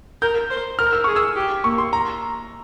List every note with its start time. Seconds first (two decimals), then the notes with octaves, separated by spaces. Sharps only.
0.22 A#4 G6
0.50 C5
0.79 A#4 F6
0.93 E6
1.04 G#4 C#6
1.16 E6
1.36 G4
1.64 A#3 C#6
1.78 C6
1.93 A#5